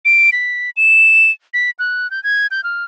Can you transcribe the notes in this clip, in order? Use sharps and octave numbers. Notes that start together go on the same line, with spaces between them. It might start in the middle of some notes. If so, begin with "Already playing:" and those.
D7
B6
E7
B6
F#6
G6
G#6
G6
F6